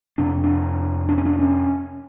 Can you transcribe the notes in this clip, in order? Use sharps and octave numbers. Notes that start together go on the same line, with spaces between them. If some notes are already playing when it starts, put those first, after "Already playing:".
F2 C3 D4
D4
D4
C#4
D4
C#4